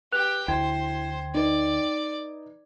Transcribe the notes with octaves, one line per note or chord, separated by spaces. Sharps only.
G4 B4 G5 F#6 F7
D2 E4 C5 G5 G#6
D#4 B4 D5